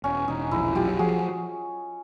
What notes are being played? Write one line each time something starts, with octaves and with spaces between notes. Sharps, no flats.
E1 C#4
E1 D#4
A#1 E4
F#3 F4 G4
F3 F#4 G#4